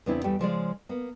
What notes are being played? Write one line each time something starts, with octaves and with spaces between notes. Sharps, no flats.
E2 C#3 B3 C4 D4 E4
E2 G3 A3 G5
C#3 F3 G#3 D5
A#3 B3